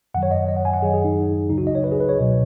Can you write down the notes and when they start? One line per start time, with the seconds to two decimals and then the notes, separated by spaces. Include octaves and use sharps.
0.14 F#2 D#3 F#3 F#5
0.23 C#5
0.31 D#5
0.48 D#5
0.56 F#5
0.65 G#5
0.74 F#5
0.82 F#2 D#3 F#3 G#4
0.94 G#4
1.04 D#4
1.50 C#2 C#3 F#3 D#4
1.58 F#4
1.67 D#5
1.75 C#5
1.84 B4
1.92 G#4
2.00 B4
2.09 C#5
2.18 C#2 B2 F#3